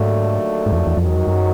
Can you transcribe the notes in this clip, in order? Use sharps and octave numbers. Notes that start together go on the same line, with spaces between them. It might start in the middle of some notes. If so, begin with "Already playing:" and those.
Already playing: D#2 G#2 D3 F#3 A3
G#2
E2
F2
E2
F2 G#2 D#3 F#3
E2
F2
F#2